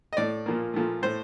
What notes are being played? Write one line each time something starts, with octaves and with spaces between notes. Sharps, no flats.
D#5
A2 A3 D5
A#2 F3 A#3
A#2 F3 A3
A2 A3 C5